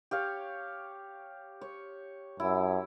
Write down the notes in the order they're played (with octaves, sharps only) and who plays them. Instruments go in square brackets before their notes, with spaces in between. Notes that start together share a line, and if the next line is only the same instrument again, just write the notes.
[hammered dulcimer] G4 C#5 F5
C#5
[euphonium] F#2 [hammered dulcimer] E4